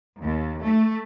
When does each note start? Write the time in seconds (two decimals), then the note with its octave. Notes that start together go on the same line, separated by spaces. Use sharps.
0.21 D#2
0.62 A3